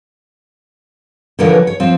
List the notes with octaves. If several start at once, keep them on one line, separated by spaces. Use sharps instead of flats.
D3 E3 F3 A#4 B4 C#5
C#5
F3 C4